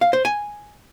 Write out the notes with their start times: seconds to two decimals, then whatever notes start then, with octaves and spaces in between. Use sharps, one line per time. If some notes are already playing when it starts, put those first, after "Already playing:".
0.01 F5
0.13 C5
0.25 G#5